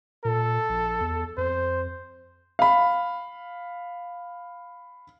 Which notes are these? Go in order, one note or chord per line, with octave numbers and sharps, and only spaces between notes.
A#2 A4
A#1
E2
F2 C5
F5 B5